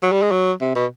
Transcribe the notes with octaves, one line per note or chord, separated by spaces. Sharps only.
F#3
G3
G#3
F#3
C3
B2